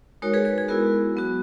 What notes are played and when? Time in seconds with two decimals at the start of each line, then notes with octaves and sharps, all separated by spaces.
0.22 G#3 D#4 F#4 A#4 C#5
0.34 G#4 B4
0.45 G#4
0.58 G#4
0.68 G#3 B3 E4 F#4 A#4
1.16 F#3 B3 F#4